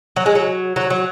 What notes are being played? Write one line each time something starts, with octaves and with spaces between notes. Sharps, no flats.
F#3
G#3
F#3
F#3
F#3